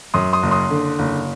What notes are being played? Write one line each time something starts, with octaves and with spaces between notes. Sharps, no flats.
F#2 C6 D#6
C6 D#6
F#1
C6 D#6
D3
F#1